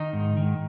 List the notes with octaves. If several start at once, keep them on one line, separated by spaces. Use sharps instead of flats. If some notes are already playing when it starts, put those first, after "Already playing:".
Already playing: D#3 D#4
G#2
D#3